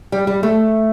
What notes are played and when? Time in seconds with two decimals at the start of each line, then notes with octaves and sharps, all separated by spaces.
0.12 G3
0.27 G3
0.43 A3